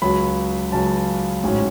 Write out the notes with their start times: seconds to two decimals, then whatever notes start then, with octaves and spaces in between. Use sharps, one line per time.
0.02 C#2 C#3 F#3 B5
0.72 C#2 C#3 F#3 A5
1.43 A1 G#2 F#3 C#4